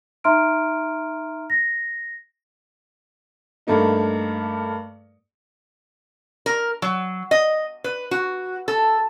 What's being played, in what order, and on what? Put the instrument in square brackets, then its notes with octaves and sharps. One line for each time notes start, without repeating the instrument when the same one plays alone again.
[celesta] D#4 E5 A#5 C6 F6 D7
A#6
[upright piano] G2 A3 A#3 D#4
[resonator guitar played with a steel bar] A#4
F#3
D#5
B4
F#4
A4